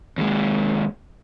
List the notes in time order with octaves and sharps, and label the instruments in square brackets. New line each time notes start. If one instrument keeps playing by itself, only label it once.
[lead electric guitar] D#2 G#3